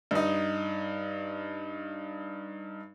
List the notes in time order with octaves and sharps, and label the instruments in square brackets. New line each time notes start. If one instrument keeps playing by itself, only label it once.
[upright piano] G2 D#4